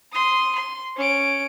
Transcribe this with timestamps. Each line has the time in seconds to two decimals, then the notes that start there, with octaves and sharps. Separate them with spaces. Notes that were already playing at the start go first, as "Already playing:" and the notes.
0.13 C6 D#6
0.56 C6
0.97 C#4 D7